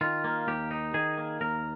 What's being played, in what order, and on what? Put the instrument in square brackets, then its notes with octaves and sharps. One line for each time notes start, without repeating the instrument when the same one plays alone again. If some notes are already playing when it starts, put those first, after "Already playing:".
[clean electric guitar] D#3 F4
A#3
D#2 G4
D#4
D#3 G#4
A#3
D#2 A#4